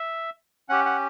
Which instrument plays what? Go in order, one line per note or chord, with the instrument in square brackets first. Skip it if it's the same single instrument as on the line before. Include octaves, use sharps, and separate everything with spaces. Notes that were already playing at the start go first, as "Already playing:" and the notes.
Already playing: [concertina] E5
C#4 G4 F#5
F#5